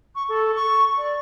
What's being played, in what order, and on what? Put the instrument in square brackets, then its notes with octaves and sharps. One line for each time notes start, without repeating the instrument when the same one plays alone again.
[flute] C#6
A4
C#6
D5